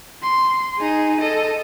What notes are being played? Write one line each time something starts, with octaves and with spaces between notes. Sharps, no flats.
C6
D#4 G#4
A4 D#5